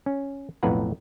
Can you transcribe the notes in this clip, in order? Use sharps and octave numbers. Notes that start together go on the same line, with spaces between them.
C#4
B1 F2 A2 B4 F#5 A#5